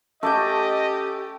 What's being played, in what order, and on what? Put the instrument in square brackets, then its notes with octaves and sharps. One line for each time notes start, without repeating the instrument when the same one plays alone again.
[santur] A3 [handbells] C#4 D6 G6 [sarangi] G4 [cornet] D#5